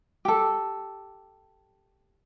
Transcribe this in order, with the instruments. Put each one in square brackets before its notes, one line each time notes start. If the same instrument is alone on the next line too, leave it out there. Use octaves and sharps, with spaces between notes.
[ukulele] G4 A4